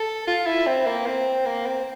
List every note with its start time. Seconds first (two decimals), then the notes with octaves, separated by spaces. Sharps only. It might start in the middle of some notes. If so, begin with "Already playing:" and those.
Already playing: A4
0.27 F4
0.46 E4
0.67 C4
0.86 A#3
1.06 C4
1.46 A#3
1.66 C4